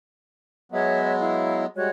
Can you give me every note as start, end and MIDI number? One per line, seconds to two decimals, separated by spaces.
0.72 1.66 54
0.72 1.66 56
0.72 1.66 59
0.72 1.14 73
0.72 1.14 75
0.72 1.14 76
1.20 1.63 64
1.20 1.63 77
1.76 1.90 55
1.76 1.90 56
1.76 1.89 66
1.76 1.89 73
1.76 1.89 90